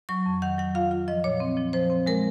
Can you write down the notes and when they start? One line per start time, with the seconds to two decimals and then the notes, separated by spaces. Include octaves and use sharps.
0.09 F#3 C#6
0.26 F2
0.42 D#3 F#5
0.58 F#3 F#5
0.75 F4 F5
0.91 F4
1.08 F3 D#5
1.24 A#2 C#5
1.40 C4
1.57 F3
1.73 F3 C5
1.90 C4
2.06 G#3 A#4